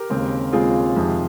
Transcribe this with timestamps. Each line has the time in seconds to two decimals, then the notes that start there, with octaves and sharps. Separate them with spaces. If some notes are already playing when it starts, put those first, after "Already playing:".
Already playing: G4 A#4
0.10 D#2 C#3 G#3 C4
0.52 D#2 C#3 G#3 C4 F4 G#4
0.96 F2 C3 D#3 G#3 C4